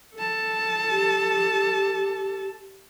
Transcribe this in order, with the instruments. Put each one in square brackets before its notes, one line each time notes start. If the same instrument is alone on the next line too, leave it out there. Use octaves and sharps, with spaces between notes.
[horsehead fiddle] A4 A5
[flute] G4